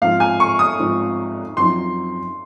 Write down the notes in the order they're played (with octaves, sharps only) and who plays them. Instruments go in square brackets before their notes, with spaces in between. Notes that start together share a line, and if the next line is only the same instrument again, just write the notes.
[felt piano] G#2 F3 C4 F4 [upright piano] F5
[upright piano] G#5
C#6
D#6
[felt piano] G#2 F3 C4 F4
[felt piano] F#2 F3 C4 D#4 [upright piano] C6